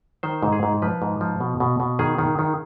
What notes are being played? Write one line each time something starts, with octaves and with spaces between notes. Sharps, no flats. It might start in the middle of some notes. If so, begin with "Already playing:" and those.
D#3 C5
G#2
G#4
G#2
F3 B4
G#2
F3
B2
B2
B2
D#3 G#4
D#3
D#3